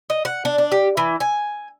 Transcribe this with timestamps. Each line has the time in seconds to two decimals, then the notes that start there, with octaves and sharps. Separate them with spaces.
0.10 D#5
0.25 F#5
0.45 D4
0.58 D4
0.72 G4
0.97 E3
1.20 G#5